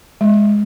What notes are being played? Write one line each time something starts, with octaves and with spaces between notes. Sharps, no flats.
G#3